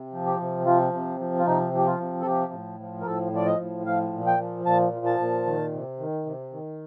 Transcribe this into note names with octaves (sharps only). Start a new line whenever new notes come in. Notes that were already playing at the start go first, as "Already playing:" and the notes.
Already playing: C3
F3
G4
C3
F3 F4
C3
F3
F4
C3 D#4
F3 G4
F4
C3
A4
F3 G4
A2
F3
A#4
A2 A4
F3 D5
D#5
A2
F3 F5
A#2
G5
F3
A#2 A5
F3
A5
A#2
D#3
C3
D#3
C3
D#3